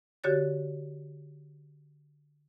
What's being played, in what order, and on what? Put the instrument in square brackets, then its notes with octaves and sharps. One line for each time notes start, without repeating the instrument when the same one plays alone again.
[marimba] D3 F#4 G4 C#5 F#6 A6